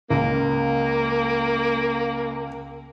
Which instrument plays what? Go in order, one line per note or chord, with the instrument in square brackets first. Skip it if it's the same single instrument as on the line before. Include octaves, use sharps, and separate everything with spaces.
[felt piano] C#2 [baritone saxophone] A#3